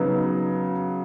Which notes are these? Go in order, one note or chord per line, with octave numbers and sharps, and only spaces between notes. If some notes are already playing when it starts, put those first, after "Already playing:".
Already playing: C#3 F#3 B3 D#4